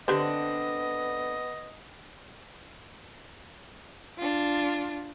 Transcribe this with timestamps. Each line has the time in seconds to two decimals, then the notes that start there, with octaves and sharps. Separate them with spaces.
0.08 D3 B3 C4 D4 G4 B4 C5 D#5
4.18 D4 F4